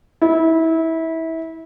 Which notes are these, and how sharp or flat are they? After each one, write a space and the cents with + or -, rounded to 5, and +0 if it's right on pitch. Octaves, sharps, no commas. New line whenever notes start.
E4 -25